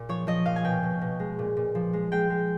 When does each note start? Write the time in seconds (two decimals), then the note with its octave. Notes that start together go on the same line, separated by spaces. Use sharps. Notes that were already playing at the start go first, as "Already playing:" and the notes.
Already playing: A#2
0.09 F3 C#5
0.27 F3 D#5
0.46 A#2 F5
0.56 G#5
0.64 B2 G5
0.83 B2
1.01 B2
1.20 G#3
1.39 A#2
1.57 A#2
1.75 F3
1.93 G#3
2.12 G#3 G5
2.30 G#3